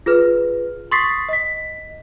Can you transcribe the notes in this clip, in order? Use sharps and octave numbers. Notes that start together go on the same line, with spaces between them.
F4 G#4 B4 F6
C6 C#6 D#6 A6 B6 C7
D#5 B6